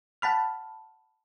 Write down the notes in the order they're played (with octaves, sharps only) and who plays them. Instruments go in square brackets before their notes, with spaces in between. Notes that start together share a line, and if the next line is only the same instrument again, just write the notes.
[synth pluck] F#5 A5 B5 F6